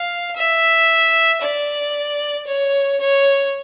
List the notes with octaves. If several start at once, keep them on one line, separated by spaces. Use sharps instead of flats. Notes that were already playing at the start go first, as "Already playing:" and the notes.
Already playing: F5
E5
D5
C#5
C#5